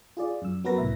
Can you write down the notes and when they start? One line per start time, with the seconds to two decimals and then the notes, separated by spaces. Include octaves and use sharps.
0.17 F4 G#4 D5
0.42 F#2 E6
0.64 F#3 B3 F#4 A#4 B4 A#6
0.77 C2 A2 E5 A#6